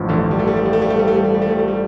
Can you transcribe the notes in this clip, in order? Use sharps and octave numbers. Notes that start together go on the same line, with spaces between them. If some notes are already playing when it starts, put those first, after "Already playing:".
Already playing: A1 G2 F3
D2 D3
G3
A3
G3
A3
G3
A3
G3
A3
G3
A3
G3
A3
G3
A3
G3
A3
G3